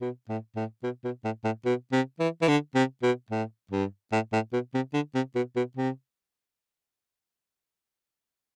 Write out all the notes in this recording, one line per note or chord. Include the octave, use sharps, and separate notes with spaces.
B2
A2
A2
B2
B2
A2
A2
B2
C3
E3
E3
D3
C3
B2
A2
G2
A2
A2
B2
C3
D3
C3
B2
B2
C3